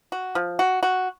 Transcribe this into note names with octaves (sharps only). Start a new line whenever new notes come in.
F#4
F3
F#4
F#4